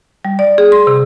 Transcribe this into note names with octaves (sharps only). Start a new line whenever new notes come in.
G3
D5
G#4
C6
C3